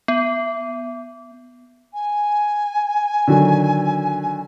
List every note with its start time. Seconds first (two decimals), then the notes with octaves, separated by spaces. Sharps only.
0.08 B3
1.94 G#5
3.28 D3 D#3 F#3